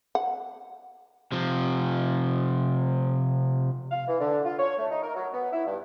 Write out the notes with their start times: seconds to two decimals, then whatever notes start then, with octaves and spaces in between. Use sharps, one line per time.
0.15 F#5
1.32 C3 F3
3.91 F5
4.08 E3
4.20 D3
4.45 F4
4.59 C#5
4.77 A3
4.91 D#4
5.03 A#4
5.15 F#3
5.33 B3
5.52 E4
5.66 G2